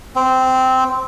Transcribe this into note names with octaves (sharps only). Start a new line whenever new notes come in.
C4